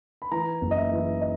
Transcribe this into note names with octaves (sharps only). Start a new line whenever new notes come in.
B5
E3 A#5
F#1
D#5
E5
E3
D#5